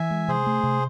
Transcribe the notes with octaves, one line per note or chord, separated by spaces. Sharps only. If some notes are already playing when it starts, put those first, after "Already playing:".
Already playing: E3 E5 G#5
G#3
C3 G#4 C5
A3
C3